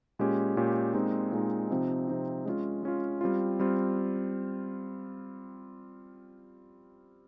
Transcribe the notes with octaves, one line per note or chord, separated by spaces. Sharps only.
A#2 G#3 C#4 G4
A#2 G#3 C#4 G4
A#2 G#3 C4 D#4
A#2 G#3 C4 D#4
C3 F3 C4 D#4
C3 F3 C4 D#4
G#3 C#4 F4
G#3 C#4 F4
G3 C4 F4
G3 C4 F4